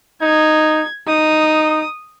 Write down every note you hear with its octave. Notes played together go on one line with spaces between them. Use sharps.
D#4 G#6
D#4 D#6